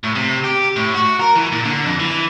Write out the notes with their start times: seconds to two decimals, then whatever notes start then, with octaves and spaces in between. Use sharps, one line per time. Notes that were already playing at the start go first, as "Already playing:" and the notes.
0.04 A2
0.15 C3
0.44 G4
0.76 A2
0.95 F#4
1.20 A#4
1.36 E3
1.52 A#2
1.65 D3
1.85 F2
2.00 E3